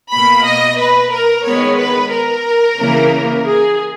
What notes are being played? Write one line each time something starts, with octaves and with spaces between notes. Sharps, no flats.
B2 A#3 B5
D#5
B4
A#4
D#3 G#3 B3 C#5
B4
A#4
C#3 E3 A#3
G#4